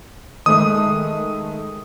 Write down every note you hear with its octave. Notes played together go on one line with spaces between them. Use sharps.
D#3 G#3 A3 D#6